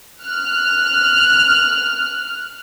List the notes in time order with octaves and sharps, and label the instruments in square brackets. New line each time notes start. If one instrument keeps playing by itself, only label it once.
[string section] F6 F#6